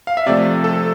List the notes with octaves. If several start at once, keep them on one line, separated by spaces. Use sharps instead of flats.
F5
E5
C3 F3 A3 D5
A4